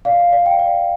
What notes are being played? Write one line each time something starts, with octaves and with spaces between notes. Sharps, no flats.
D5 F5
D5
G5
D5